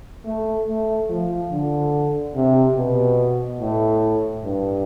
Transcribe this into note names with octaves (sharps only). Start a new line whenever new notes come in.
A3
A3
F3
D3
C3
B2
A2
G2